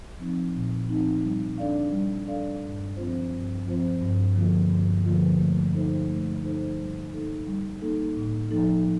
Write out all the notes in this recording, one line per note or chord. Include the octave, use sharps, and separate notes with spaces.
F3 C4 D#4
A#2
F3 C4 D#4
G3
D4 A4 D5 F5
G3
D4 A4 D5 F5
G2
F3 C4 F4 C5
G2
F3 C4 F4 C5
G2
D3 F3 A#3 F4
G2
D3 F3 A#3 F4
A3
D#4 A4 C5
A3
D#4 A4 C5
G3
A#3 D#4 A4
G3
A#3 D#4 A4
A2
F3 A#3 D#4 A4